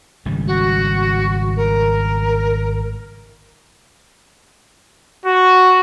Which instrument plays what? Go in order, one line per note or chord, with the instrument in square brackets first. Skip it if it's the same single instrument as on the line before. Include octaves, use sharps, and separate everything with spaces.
[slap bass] G#1 C#3 G3
[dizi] F#4
A#4
[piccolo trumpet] F#4